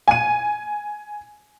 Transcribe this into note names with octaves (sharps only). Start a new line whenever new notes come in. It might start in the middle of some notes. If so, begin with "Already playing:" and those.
G#5 D#7